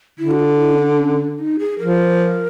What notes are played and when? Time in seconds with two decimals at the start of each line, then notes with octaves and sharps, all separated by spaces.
0.19 D3 E4
0.31 F#4
0.39 F4
0.59 E4
0.73 C#4
0.79 D4
0.99 C#4
1.19 D4
1.39 D#4
1.59 G#4
1.79 F3 A#4